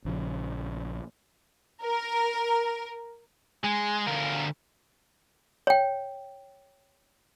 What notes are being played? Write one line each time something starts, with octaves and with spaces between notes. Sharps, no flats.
A#1 C#3 F3
A#4
G#3 G#5
D2 A#4 F5
C#5 G5